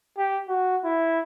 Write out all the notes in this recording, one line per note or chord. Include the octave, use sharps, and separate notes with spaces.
G4
F#4
E4